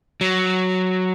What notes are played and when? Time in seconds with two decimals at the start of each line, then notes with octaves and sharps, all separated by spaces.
0.21 F#3